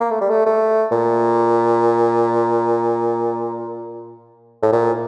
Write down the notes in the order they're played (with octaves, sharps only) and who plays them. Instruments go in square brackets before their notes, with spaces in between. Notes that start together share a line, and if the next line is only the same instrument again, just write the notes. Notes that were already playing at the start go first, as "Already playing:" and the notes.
[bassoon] A#3
A3
G3
A3
A3
A#2
A2
A#2